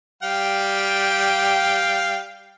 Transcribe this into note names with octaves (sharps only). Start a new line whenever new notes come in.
G3 F5 G5